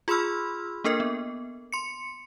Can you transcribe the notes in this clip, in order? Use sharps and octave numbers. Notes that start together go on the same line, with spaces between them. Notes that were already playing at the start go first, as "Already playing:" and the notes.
F4 G#4 B5 C6 E6 F6
A#3 D4 A4 A#4 D#5
B3
C6 C#7